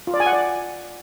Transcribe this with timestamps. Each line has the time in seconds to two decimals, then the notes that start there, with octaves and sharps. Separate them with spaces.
0.07 F4
0.14 D5
0.20 G#5
0.26 F#5
0.33 D5